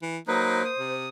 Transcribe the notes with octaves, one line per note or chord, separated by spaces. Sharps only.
E3
F#3 A#3 D#4 B4 C5
D#6
C3